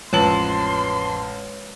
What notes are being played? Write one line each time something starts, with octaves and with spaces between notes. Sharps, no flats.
A1 F2 G#3 B4 C#5 A5 C6 F#7